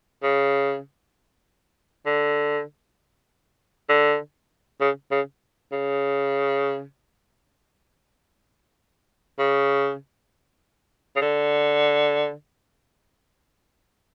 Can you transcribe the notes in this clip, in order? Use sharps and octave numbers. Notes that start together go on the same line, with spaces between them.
C#3
D3
D3
C#3
C#3
C#3
C#3
C#3
D3